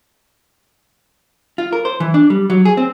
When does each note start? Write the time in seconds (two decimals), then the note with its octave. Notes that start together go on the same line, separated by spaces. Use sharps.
1.58 F4
1.73 A#4
1.85 C5
2.00 E3
2.14 D4
2.30 G3
2.50 F#3
2.65 G#4
2.77 C4